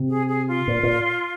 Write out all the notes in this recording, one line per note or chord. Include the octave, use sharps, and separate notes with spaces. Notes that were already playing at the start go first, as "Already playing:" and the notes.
Already playing: C3
G#4
G#4
F4
A#2
A#2